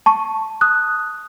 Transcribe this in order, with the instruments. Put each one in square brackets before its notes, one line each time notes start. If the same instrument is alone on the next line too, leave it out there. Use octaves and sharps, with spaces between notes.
[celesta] A5 C#6
D#6 F#6